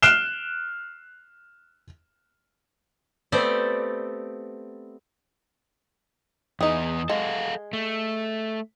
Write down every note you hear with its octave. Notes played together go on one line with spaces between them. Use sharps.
F6 F#6 C7 D7 E7 G7
A3 B3 C4 G4 C5 D5
E2 B3 D#4 G#4
G#3 A4 F5 F#5
A3